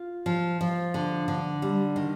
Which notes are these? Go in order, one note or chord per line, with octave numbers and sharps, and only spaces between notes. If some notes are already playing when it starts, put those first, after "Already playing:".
Already playing: F4
F3
F3
D3
D3
G3
D#3